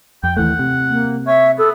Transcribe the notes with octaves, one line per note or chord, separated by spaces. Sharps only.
F2 G5
D#2 E3 A3 F#5
C3
A#3
C#5 E5
B3 A4